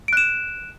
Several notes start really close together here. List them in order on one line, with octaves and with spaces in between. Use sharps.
D7 F#6 E7